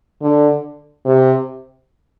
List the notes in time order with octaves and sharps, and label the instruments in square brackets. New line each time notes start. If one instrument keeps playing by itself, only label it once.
[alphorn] D3
C3